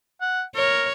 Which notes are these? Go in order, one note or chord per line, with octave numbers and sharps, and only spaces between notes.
F#5
A#4 C#5